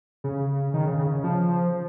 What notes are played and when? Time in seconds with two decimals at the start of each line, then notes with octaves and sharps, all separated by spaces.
0.24 C#3
0.74 D#3
0.87 C#3
0.99 C#3
1.11 C#3
1.24 F3